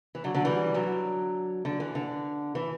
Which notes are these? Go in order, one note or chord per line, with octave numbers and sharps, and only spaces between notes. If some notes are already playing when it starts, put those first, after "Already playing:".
E3
D3 F#3
D3 F#3
E3 G3
D3 F#3
D3
E3
D3
E3